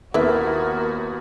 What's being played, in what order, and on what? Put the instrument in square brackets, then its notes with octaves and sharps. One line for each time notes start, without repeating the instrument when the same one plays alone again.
[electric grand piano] D#2 B3 [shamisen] E4 B4 E5 [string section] F#4 [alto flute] A#4